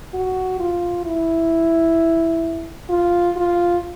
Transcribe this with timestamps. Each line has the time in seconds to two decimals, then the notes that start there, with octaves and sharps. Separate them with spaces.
0.14 F#4
0.60 F4
1.05 E4
2.90 F4
3.37 F4